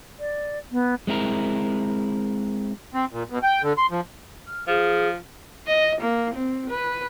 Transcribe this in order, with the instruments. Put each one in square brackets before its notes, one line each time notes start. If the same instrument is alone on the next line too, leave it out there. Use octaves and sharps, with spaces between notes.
[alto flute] D5
B3
[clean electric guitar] G#3 C4 E4 A#4
[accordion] C4
A#2
B2
G5
D3
C6
F3
[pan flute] F6
[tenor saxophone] F3 [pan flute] G#4
[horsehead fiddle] D#5
A#3
C4
B4